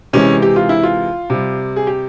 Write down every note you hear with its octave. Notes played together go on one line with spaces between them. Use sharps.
C3 E3 G#3 C#4
G4
F4
E4
F4
C3 G3
G#4
G4